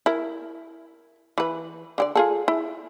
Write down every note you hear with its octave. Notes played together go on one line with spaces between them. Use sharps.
E4 A#4
E3 B4
D3 G4 D5
F4 G#4 A4
E4